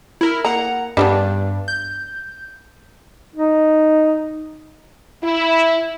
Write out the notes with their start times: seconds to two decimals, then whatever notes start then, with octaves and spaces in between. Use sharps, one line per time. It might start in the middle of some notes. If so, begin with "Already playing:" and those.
0.21 E4 A#4
0.45 A#3 F#5 A#5
0.97 G2 G3 A3 B3 D4
1.68 G6
3.36 D#4
5.23 E4